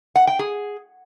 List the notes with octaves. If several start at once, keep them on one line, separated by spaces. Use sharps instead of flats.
F#5
G5
G#4